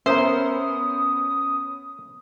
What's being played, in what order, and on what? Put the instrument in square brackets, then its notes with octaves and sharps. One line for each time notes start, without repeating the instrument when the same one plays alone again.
[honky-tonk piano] B3 C#4 [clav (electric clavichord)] A#4 E5 [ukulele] C5 [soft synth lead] D#6